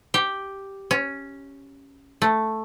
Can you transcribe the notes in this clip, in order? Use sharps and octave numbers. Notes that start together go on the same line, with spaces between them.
G4
C#4
A3